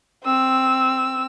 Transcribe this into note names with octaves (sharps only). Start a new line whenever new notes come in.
C4 E6